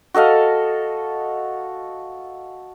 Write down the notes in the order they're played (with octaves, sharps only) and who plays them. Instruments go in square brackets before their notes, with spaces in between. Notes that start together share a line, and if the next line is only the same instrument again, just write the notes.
[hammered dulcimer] F#4 A4 D#5 F5